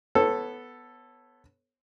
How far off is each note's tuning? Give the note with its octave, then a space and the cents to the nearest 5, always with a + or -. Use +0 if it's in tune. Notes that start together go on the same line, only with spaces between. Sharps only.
B3 +0 A4 +0 C#5 -25